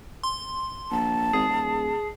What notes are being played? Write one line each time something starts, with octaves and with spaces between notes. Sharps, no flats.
C6
A#1 A5
G#1 G#4
D#1